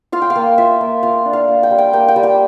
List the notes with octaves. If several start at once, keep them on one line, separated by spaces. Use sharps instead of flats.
F4 F5
G5
F5
A#3
F4 E5
A#3
F4 F5
D4
F5
A#3
G5
G3
G5
A#3 G5
G5
G3
G5